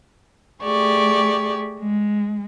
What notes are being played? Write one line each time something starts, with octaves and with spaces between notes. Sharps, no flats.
A3 G4 G#4 D5 C#6
G#3